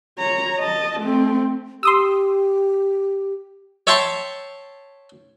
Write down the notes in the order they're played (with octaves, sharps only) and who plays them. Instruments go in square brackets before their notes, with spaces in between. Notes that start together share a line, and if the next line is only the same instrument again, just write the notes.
[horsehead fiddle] C#5 A#5
D#5 A5
A3 C4
[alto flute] G4 [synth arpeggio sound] C6 D#6 E6
[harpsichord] C#5 E5 G5 A5 C6 C#6